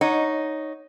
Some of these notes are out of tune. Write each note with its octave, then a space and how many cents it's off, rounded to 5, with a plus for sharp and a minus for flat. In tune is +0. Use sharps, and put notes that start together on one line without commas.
D#4 +0 C#5 +0 F#5 -25